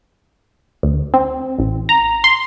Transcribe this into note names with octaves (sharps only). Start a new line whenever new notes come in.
D2
C4
A1
A#5
C6